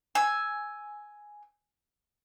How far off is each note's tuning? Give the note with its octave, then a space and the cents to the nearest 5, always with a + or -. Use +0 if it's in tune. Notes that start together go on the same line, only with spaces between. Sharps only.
G#5 +5 E6 +0